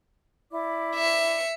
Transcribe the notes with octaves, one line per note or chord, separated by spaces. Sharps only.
E4 D5 D6
E5 C#7